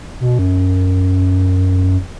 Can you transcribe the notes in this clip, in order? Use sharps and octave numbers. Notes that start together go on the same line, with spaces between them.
B2
F#2